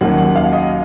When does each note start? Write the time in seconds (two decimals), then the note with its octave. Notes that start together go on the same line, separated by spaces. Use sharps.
0.01 D#2 D#3 F#3 A#3 C#4 F#5
0.18 F#5
0.35 F5
0.53 D#5